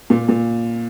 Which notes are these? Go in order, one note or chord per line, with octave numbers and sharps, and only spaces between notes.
A#2
A#2